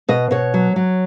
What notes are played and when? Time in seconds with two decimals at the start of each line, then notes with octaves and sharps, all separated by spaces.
0.08 B2 D#5
0.31 B2 C#5
0.54 F#3
0.76 F#3